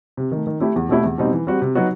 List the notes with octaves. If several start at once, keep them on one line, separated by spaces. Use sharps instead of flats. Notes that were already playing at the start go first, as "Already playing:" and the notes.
C3
D#3 A3
D#3
A3 E4 G4
E2
B2 A3 E4 G4
E2
B2 G3 C4 D#4
E3
G3 C4 F#4
C3
F#3 B3 D#4 F#4